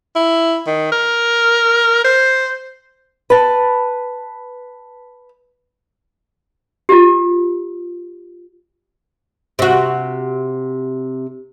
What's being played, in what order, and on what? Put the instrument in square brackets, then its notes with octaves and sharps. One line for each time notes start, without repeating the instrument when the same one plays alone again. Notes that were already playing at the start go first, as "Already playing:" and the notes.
[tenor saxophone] E4
D#3
A#4
C5
[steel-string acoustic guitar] B4 A5
[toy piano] F4 G4
[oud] C3 F#4